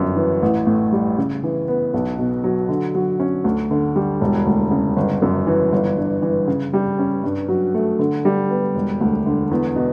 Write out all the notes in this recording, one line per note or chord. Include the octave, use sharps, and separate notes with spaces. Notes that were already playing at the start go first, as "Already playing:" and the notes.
Already playing: G1 F#2
E3
A1
A2
G3
C#3
E3
B3
B1
B2
F#3
D3
F#3
C#4
D2
D3
G3
E1
D2
C#3
G1
F#2
E3
G1
G2
E3
C#3
G3
C#4
G2
F#3
A3
D3
G3
B3
E1
D2
D3
E2
B2